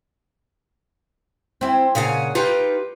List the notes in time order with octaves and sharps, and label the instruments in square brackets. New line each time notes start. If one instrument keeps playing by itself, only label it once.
[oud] C4 E4
[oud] A#2 C#3 F5 [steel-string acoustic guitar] C#5 F#5 G#5
[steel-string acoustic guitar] D#4 G4 B4 [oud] F4